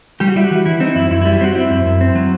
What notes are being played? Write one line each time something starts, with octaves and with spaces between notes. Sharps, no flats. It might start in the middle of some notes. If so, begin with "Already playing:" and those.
G3 G4
F#4
G3 E4
F#4
E3
E3 E4
C4 D#4
F#2 E4
F#2 E4
E4
G3
E4
C4 F#4
C4 E4
F#2
F#2
C4
F#3